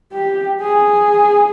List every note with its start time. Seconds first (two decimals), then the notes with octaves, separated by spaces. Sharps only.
0.13 G4
0.61 G#4